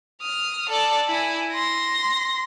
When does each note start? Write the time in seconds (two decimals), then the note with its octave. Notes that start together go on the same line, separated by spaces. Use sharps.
0.22 D#6 F6
0.69 A4 D5
1.08 E4 G#5
1.53 C6 A#6